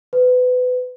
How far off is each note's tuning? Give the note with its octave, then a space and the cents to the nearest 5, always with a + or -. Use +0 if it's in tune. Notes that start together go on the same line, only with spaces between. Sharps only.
B4 +25